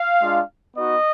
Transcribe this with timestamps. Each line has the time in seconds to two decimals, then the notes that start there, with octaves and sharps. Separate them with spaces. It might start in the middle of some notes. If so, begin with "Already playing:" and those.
Already playing: F5
0.21 G#3 D4 F4
0.76 B3 D#4 F#4 D#5